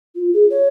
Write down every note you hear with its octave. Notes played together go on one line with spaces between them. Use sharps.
F4
G#4
C#5